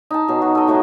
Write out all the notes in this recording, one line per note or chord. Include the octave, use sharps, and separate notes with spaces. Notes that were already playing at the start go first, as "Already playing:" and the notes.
D#4 A5
B2 F#3 G#4
F#4
A4 D#5
A2 F#3 B3 E4